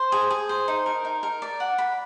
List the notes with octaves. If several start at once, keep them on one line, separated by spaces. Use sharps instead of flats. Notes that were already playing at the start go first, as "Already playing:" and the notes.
Already playing: C5
G#4
G#4
C5
D#4
A#4
D#4
A#4
D5
F#5
B5